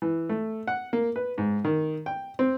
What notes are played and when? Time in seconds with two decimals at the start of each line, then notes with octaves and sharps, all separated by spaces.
0.02 E3
0.29 A3
0.68 F#5
0.93 A#3
1.16 B4
1.38 G#2
1.65 D#3
2.06 G5
2.39 C4